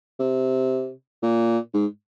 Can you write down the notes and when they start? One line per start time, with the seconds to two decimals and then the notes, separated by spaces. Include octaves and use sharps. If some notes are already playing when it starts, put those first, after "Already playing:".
0.20 C3
1.22 A#2
1.74 G#2